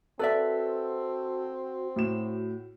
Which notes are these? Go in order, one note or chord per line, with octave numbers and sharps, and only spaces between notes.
C4 F#4 A4 B4 D5 E5
A2 F#4 E7